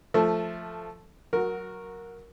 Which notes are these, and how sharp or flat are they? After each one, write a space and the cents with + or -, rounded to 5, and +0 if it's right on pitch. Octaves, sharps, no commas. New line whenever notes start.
F3 +0 A3 +0
F#3 +0 F#4 -15 A#4 +0